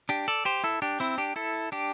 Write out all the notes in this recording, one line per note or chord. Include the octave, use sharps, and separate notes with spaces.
D4 G4
A4 D5
G4 C5
E4 A4
D4 G4
C4 E4
D4 G4
E4 A4
D4 G4